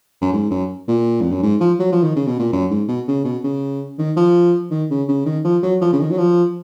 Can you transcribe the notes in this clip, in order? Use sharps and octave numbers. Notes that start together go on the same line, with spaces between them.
F#2
G#2
F#2
A#2
F2
F#2
G#2
F3
F#3
F3
D#3
C#3
B2
A#2
F#2
G#2
B2
C#3
B2
C#3
D#3
F3
D#3
C#3
C#3
D#3
F3
F#3
F3
C#3
D#3
F#3
F3